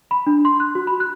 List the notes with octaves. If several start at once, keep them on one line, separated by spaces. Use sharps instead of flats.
B5
D4
C6
F#6
F#4
B5
F#6